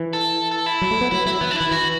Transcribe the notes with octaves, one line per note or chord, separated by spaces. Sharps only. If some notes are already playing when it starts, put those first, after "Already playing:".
Already playing: E3
A4
A4
E4
F#3
A3
B3
F#3 E4
F#3 E4
E3 B3
D4
E3 E4
E3 F#4